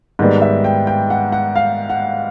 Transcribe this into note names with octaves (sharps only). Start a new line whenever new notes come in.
G#2 D#3 G3 B3 D#5
E5
G5
G5
F#5
F#5
F5
F#5